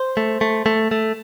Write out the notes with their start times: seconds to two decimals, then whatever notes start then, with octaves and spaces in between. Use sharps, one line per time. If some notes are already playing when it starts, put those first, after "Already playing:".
Already playing: C5
0.17 A3
0.41 A3
0.66 A3
0.91 A3